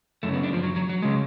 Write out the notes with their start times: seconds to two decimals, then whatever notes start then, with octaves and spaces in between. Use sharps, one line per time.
0.23 F#2 C#3 A3
0.34 B3
0.43 D4
0.53 F3
0.63 F#3
0.76 F#3
0.89 F#3
1.02 C#3 G#3